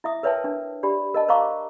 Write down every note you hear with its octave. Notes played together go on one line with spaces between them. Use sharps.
E4 E5 D#6
A#4 B4 C#5 E5 G5 A5
D4
D4 G4 D5 B5
A#4 D#5 A5
A#4 C5 F5 A#5 C#6 D6